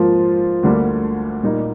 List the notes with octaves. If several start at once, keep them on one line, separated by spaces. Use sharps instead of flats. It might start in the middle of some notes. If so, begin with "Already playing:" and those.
Already playing: G#2 F3 A#3 F4
D2 D3 G3 A#3
A#2 G3 A#3 D#4